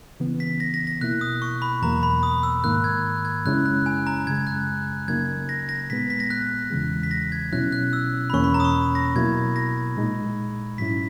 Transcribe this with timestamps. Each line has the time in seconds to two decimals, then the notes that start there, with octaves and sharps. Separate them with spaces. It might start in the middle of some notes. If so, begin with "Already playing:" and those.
0.20 C#3 E3 B3
0.40 B6
0.60 A#6
0.74 A#6
0.87 A#6
1.01 B2 A#3 E4 F#6
1.21 D#6
1.42 C#6
1.62 B5
1.82 E2 B2 F#3 A#3 A#5
2.03 B5
2.23 D#6
2.43 E6
2.64 G#2 D#3 A#3 F#6
2.84 G#6
3.25 G#6
3.45 F#2 C#3 G#3 C#4 E4 F#6
3.65 F#6
3.86 G#5
4.07 A#5
4.26 F#2 C#3 G#3 G#6
4.47 F#6
5.08 C#3 F#3 A#3 D#4 G#6
5.49 A#6
5.69 A#6
5.90 A#2 G#3 B3 B6
6.10 B6
6.20 A#6
6.30 F#6
6.71 E2 C#3 E3 G#3
7.03 B6
7.11 A#6
7.32 G#6
7.53 B2 F#3 C#4 E4 F#6
7.72 F#6
7.93 E6
8.30 B5
8.33 E2 B2 A#3 C#4 C#6
8.44 B5
8.54 A#5
8.60 D#6
8.64 C#6
8.95 A#6
9.15 B2 F#3 A#3 E4 G#6
9.56 A#6
9.97 A#2 G#3 D#4
10.78 G#2 F#3 C#4 E4 B6